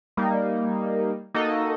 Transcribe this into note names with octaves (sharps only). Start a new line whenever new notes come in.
G3 A#3 D#4
A#3 D#4 F#4 A4 D#5